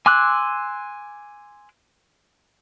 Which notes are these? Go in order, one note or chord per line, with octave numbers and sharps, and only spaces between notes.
G#5 C6 D6 E6 F#6